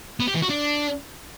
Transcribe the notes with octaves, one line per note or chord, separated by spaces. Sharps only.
B3
G4
E3
F#4
D4